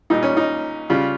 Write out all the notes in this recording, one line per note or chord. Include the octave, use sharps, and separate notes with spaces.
A#2 G3 D#4
C#4
D#4
C#3 G3 F4